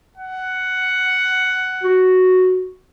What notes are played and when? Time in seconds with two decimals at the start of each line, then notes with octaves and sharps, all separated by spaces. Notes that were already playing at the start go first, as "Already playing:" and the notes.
0.18 F#5
1.83 F#4